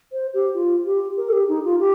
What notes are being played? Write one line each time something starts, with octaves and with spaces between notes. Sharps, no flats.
C5
G4
F4
G4
A#4
A4
G4
D#4
F4
G4